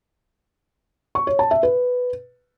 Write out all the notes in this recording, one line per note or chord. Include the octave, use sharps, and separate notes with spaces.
C#6
C#5
A5
E5
B4